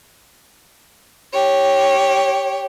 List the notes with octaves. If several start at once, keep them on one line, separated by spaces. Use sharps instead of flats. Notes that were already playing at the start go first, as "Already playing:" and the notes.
G4 C#5